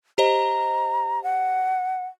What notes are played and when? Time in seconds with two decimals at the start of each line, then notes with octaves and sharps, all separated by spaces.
0.18 G4 C5 D#5 A#5
1.24 F#5